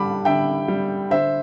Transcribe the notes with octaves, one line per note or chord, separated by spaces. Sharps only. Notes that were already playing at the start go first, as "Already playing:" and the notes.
Already playing: D3 G3 A5 B5 D6
D3 E5 G5
G3
D3 C5 E5